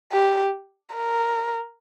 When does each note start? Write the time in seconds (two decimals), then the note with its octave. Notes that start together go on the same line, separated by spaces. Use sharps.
0.12 G4
0.94 A#4